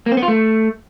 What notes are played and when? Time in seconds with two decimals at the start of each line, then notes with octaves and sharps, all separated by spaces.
0.06 A#3
0.12 C4
0.17 B3
0.23 F4
0.28 A3